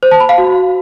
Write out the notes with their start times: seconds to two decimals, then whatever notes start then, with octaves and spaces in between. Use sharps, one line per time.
0.03 C5
0.11 A5
0.20 B5
0.29 F5
0.38 F#4